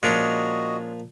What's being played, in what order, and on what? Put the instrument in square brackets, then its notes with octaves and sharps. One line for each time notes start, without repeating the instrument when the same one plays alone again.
[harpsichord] A#2 F3 A#5 [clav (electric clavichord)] G#3 C#4 D4 [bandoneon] F#4 D#5